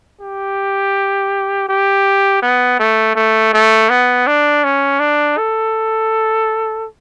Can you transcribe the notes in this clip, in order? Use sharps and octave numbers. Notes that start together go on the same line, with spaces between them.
G4
G4
B3
A3
A3
A3
B3
D4
C#4
D4
A4